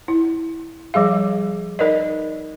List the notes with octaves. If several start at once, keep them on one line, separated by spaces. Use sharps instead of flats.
E4
F3 G3 G#4 F5
D#4 A#4 B4 D5 D#5